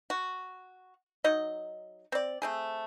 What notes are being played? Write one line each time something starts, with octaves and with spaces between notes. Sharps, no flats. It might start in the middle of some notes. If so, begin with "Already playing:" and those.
F#4
F#3 D#4 D#5
C4 D5
A3 C4 G#4